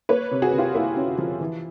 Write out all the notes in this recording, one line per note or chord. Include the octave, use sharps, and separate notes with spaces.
A#3 B4 C#5
C3
F#4 G#4
C3
F4 G4
A#3 E4
C#4
F3
E3